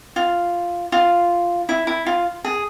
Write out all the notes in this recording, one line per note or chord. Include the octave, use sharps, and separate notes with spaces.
F4
F4
E4
E4
F4
G#4